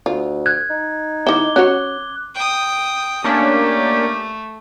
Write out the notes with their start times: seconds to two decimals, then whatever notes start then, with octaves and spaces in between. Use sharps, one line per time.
0.06 D2 F4
0.46 F#6 G#6
0.70 D#4
1.27 D#3 E4 D6 G7
1.56 C#4 F#4 C#5 F#6
2.35 G5 D#6
3.24 A3 A#3 C#4 D4 G4